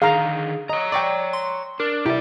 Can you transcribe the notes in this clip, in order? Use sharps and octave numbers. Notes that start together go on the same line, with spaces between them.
D3 D#3 G#4 F5 A#5
C#5 D#5 A#5
D5 G5 C#6 D6
C6
D4 A#4
C3 E4 G4 D5